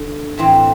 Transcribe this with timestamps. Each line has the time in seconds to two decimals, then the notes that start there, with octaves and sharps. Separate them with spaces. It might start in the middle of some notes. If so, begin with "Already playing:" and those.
Already playing: D3
0.38 A2 E3 C4